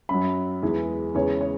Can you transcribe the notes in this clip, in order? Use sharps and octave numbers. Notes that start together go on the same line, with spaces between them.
F#2 F#3 B5
E2 E3 G#3
E2 C#3 E3 G#3 C#5
C#5